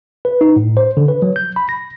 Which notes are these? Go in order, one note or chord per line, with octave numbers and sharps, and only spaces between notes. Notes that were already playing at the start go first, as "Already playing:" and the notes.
B4
D#4
A2
C5
D3
B4
F#3
G6
B5
A#6